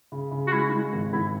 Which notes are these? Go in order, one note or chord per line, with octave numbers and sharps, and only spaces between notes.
C#3
C#3
F#4
G#3 E4
D#4
G#3 E4
G#1
G#1 E4